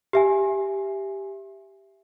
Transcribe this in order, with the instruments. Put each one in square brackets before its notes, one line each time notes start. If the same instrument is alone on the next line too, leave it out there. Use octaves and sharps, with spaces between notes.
[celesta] G4 E5 G#5